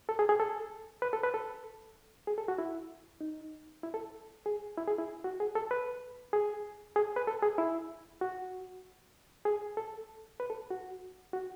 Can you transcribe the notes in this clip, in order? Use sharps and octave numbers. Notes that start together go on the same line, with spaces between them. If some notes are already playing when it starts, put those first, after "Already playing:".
A4
G#4
G#4
A4
B4
A4
B4
A4
G#4
A4
F#4
E4
D#4
E4
A4
G#4
E4
G#4
E4
F#4
G#4
A4
B4
G#4
G#4
B4
A4
G#4
E4
F#4
G#4
A4
B4
A4
F#4
F#4